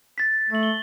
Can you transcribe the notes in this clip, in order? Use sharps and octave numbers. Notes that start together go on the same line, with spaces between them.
A6 B6
A3 A6 F#7
G7